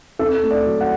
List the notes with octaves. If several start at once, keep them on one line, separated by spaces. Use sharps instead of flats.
C4 A4
A3
D5
F#3
F#5